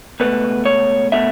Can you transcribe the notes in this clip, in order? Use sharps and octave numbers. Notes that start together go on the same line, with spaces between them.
C#2 B2 A3 B4
C#5
B2 A3 E5